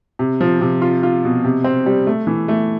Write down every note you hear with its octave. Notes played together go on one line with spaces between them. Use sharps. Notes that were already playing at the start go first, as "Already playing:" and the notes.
C3
F3
C3
F4
F4
B2
C3
C4
G3
A3
E3
A3